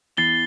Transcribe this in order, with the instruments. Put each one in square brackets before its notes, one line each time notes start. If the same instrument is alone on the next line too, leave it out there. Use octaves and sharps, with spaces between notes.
[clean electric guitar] E2 E3 [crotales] A6 C7 G7